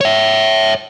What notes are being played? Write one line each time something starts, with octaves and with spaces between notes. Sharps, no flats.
C#5 E5